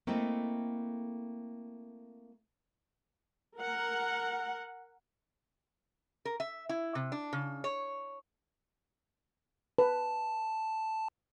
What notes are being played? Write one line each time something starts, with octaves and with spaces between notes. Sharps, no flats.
A3 A#3 C4 E4 A4 D#5
A#4 F#5
A#4
E5
E4
C3
D4
C#3
C#5
B4 A5